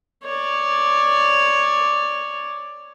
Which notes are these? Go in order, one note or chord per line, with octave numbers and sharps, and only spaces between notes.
C#5 D5